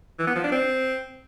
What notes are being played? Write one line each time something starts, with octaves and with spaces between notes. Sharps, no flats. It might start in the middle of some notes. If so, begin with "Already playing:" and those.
E3
B3
F3
D4
C4